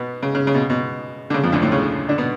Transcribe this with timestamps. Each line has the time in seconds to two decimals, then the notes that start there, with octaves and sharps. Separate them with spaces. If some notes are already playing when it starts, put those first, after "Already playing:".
Already playing: B2 B3
0.22 C#3
0.35 C#3
0.47 C#3
0.54 B2
0.70 B2
1.30 D3
1.34 C#3
1.43 F2 F3
1.52 D2 D3
1.62 A2 A3
1.72 C#3 C#4
2.09 D3 D4
2.18 B2 B3